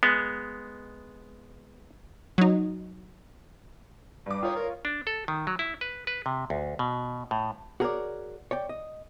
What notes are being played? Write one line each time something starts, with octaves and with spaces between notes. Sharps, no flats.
G#3 B3
F#3 D#4
G2 D6
F4 C#5 G5 A#5 D#6
A#4
D4
A4
D#3
F#3
E4
B4
B4
C3
D2
B2
A2
F#4 G#4 A#4 B4 C#5 D5
C#5 D5 G5
D#5